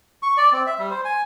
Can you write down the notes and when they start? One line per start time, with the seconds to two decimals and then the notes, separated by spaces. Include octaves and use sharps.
0.23 C#6
0.37 D5
0.52 C4
0.67 E5
0.79 G3
0.90 C5
1.05 G#5